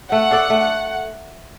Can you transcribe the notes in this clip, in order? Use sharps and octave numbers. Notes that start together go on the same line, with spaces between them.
A3 F#5
D4 A4 D5
A3